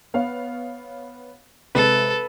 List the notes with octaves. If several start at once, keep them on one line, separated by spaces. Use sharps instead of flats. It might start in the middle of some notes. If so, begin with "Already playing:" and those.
B3 C#5 F5
C3 G#3 A4 B4